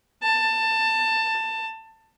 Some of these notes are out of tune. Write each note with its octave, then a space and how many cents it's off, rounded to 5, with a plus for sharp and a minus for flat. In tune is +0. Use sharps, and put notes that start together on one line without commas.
A5 +20